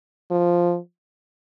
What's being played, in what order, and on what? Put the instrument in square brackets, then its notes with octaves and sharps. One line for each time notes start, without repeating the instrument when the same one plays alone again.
[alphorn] F3